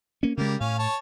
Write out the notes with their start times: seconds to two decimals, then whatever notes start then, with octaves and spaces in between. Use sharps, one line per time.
0.23 A#3 C#4
0.37 C#3 G3 G#3 A#3
0.60 A2 C#4 F5
0.79 C#5 A5